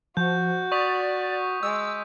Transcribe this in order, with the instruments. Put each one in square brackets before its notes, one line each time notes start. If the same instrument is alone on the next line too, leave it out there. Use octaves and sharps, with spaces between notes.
[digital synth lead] F3 [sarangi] F#4 [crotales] G6
[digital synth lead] D5 [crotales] C#6 D#6 B6
[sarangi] G#3 [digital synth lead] E6